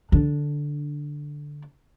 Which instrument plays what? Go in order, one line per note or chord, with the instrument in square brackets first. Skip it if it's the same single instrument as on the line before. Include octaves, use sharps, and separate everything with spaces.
[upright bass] D3 D4